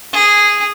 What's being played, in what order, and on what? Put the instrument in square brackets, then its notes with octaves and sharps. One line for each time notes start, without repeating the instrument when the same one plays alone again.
[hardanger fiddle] G#4